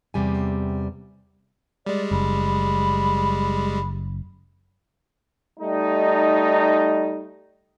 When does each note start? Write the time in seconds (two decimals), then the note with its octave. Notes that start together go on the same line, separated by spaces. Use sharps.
0.14 E2 C3 G3 G#5
1.86 G3 G#3 D5
2.11 F#1 B5
5.60 G3 A3 D#4